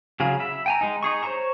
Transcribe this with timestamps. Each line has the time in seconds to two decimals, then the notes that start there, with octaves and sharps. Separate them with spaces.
0.20 C#3 F#3 G#4 F5
0.40 E5 B5
0.66 G5 G#5 A#5
0.81 G#3 D#4
1.03 D#4 G#4 C#6
1.23 C5 C#5 A#5 C#6